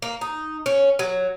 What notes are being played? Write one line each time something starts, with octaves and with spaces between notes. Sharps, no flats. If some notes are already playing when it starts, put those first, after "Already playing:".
A#3
D#4
C#4
F#3